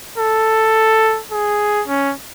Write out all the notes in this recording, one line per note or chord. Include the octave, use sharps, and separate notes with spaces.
A4
G#4
C#4